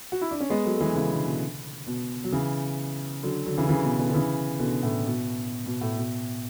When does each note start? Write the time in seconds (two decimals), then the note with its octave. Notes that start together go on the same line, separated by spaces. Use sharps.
0.12 F#4
0.21 E4
0.31 D4
0.41 C#4
0.50 G#3 B3
0.65 F#3 A3
0.76 A3
0.81 E3 G#3
0.96 C#3 E3
1.11 B2 D3
1.25 B2
1.87 B2
2.24 F#3
2.32 C#3 E3
3.23 D3 F#3
3.46 D3 F#3
3.57 C#3 E3
3.69 C#3 E3
3.84 B2
3.99 B2 D3
4.09 D3
4.14 C#3 E3
4.59 B2 D3
4.83 A2
5.06 B2
5.66 B2
5.81 A2
5.97 B2